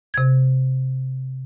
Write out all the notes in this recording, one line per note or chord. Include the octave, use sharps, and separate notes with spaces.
C3 G#6